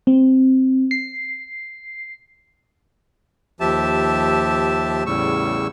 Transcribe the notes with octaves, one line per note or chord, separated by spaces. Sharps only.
C4
C7
D#2 F3 G4 E5 A5
E2 A2 C#3 G3 C#6 E6